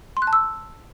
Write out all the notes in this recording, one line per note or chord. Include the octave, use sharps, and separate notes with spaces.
C6
F#6
A5
E6